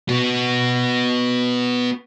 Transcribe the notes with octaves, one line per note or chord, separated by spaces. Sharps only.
B3 F#4